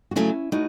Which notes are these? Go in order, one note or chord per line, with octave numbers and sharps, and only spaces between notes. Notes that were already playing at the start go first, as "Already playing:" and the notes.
F#4
C#3 F#3 A3 C#4 E4
A2 D#4 F#4